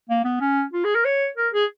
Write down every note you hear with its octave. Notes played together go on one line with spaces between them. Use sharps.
A#3
B3
C#4
F4
G#4
A#4
C#5
A#4
G#4